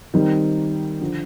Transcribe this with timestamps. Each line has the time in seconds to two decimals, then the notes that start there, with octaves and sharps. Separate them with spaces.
0.14 D#3 G3 C4 D#4
1.01 D3 F3